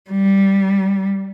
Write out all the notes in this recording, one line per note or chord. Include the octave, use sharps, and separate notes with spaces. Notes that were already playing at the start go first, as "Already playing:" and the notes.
G3